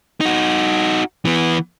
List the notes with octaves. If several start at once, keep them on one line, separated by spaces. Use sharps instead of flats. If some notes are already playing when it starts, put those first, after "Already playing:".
D#4 F#4
E3 B3